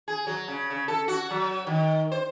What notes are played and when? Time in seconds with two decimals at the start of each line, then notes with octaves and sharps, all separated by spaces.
0.08 G#4
0.27 F#3
0.48 C#3
0.70 C#3
0.88 A4
1.08 F#4
1.30 F#3
1.67 D#3
2.12 C5